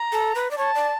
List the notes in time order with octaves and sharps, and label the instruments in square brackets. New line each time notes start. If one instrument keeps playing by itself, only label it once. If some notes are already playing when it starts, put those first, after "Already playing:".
Already playing: [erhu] A#5
[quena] A4
B4
D5
[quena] C#5 [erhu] A5
[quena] D5